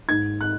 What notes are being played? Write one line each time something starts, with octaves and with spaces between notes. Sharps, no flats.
G#2 G#6
F#6